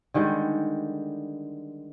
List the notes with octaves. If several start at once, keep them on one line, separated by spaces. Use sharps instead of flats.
D3 D#3 G3 G#3